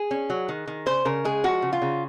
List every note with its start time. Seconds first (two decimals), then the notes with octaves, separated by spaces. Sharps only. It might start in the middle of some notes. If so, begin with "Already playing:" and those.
Already playing: G#4
0.11 C#4
0.30 F#3
0.49 D#3
0.67 D#3
0.86 C#3 C5
1.05 C#3 A#4
1.25 G#3 G#4
1.44 F3 F#4
1.62 C#3
1.73 F4
1.82 C#3